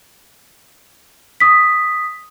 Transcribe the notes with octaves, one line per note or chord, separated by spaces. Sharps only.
D#6 B6